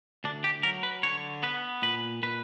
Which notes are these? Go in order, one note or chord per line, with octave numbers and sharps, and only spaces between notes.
D2 D4
G4
F#3 A#4
B4
D3 C#5
B3 B4
A#2 B4
A#2 B4